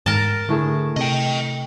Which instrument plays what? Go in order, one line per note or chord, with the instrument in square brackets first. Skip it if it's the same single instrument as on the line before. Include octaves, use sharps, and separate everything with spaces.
[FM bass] G#2 [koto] A#4 A5
[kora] A2 A3 G#4 [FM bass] D3
[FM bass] C3 [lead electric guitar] D#5 G5